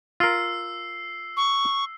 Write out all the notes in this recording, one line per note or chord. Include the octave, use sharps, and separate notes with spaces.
F4 A#4 E6 C7
C#6